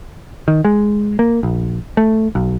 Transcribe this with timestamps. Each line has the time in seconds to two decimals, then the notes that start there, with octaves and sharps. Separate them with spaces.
0.48 D#3
0.65 G#3
1.19 A#3
1.43 A#1
1.97 A3
2.35 B1